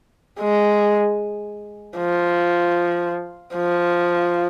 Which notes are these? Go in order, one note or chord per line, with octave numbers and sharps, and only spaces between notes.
G#3
F3
F3